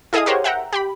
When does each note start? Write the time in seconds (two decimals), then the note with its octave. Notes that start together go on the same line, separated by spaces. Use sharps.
0.13 E4 G#4 A4 D#5 F5 D#6
0.26 G4 A#4 C5 C#5 F#5
0.44 E5 F#5 G5 A#5
0.73 G4 G5 B5